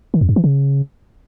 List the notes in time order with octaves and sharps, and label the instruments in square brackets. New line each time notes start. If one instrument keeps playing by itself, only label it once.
[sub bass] D#3
F2
G2
E3
C#3